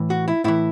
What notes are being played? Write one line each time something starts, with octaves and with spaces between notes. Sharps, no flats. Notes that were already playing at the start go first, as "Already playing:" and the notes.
Already playing: A2 E3
F#4
E4
A2 E3 E4